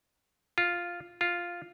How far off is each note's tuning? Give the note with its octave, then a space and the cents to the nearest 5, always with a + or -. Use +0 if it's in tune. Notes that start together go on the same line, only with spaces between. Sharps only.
F4 +0
F4 +0